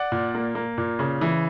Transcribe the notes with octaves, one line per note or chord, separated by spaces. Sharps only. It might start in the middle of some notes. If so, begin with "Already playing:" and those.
Already playing: D5 F#5
A#2
A#3
A#3
A#2
C#3
E3